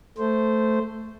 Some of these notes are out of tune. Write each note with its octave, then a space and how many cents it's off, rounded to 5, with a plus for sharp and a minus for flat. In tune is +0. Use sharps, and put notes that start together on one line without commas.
A3 +0 C5 -10